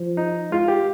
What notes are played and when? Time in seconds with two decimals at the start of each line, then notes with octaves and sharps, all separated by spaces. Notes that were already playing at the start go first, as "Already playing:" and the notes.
Already playing: F3
0.17 D#4
0.51 G#3 F4
0.68 G4